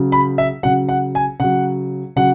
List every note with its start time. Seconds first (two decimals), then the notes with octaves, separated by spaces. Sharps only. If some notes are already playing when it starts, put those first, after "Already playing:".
Already playing: C#3 F#3
0.12 B5
0.38 E5
0.63 C#3 F#3 F#5
0.89 F#5
1.15 G#5
1.40 C#3 F#3 F#5
2.16 C#3 F#3 F#5